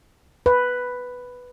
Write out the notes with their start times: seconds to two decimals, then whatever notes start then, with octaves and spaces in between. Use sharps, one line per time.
0.46 B4